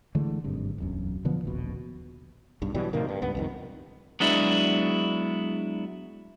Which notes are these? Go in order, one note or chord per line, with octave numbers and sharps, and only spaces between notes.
D3 E3 G#3 A3
G#1 G2 C3
E1 B1 F#2
B2 D3 F3 B3
D#1 A#1 B2
B1 G2
B2 E3 F#3 G3
A2 C3 D#3 A#3
G2
C#2 G2 B3
C2 F2 D#3
F#3 G#3 B3 D4 E4